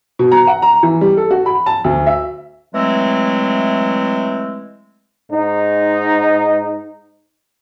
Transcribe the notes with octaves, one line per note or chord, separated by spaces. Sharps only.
B2
A#5
F#5
A#5
E3
G3
A4
F#4
B5
A5
D2
E5
E3 F#3 G#3 A3 C4
G#2 D#4